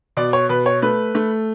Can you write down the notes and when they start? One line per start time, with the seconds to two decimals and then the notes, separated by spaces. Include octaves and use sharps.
0.17 B2 D5
0.33 C#5
0.49 B2 B4
0.66 C#5
0.82 A3 B4
1.15 A3